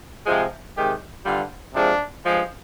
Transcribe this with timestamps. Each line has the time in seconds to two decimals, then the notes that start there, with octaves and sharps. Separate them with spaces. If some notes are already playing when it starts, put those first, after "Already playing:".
0.26 C3 F3 G#3
0.76 C3 D#3 G#3 G4
1.25 G2 D3 G3 F4
1.74 C3 F3 G#3 D4
2.23 G2 F3 G#3